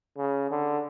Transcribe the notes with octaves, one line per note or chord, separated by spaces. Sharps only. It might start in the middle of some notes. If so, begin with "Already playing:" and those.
C#3
D3